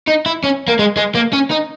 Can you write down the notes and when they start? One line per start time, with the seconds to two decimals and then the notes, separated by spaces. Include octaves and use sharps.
0.08 D#4
0.26 E4
0.44 C#4
0.68 A#3
0.79 G#3
0.97 G#3
1.15 A#3
1.33 C#4
1.50 D#4